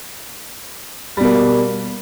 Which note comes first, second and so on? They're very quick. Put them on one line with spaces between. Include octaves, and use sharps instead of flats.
G3 B2 A#3